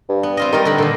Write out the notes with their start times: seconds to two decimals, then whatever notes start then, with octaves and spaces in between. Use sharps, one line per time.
0.09 G2
0.23 B3
0.37 C4 F4 D#5
0.52 D#3 G3 D#4 A#4
0.65 D3 A#4 B5
0.78 A#2 D3 D#3